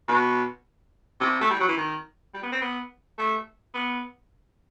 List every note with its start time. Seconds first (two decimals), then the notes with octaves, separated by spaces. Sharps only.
0.08 B2
1.20 C3
1.41 A3
1.50 G3
1.60 F#3
1.68 E3
1.77 D#3
2.34 G3
2.43 B3
2.52 C4
2.61 B3
3.19 A3
3.74 B3